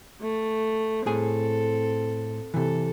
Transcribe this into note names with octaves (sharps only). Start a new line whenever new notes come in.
A3
A2 C4 G#4 A4 G#5
C3 E3 A4